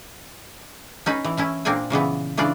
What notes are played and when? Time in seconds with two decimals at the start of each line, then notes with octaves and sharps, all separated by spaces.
1.06 C#4 D#4 B4
1.24 E3
1.37 A3 C#4 E4
1.65 A#2 A#3 C4 D4 G#5
1.90 A#2 C#3 E3 B3
2.37 C#3 E3 D4 F4 D5